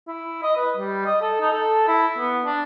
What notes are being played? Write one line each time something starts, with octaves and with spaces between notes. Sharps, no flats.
E4
D#5
B4
G3
D#5
A4
D#4
A4
E4
B3
D4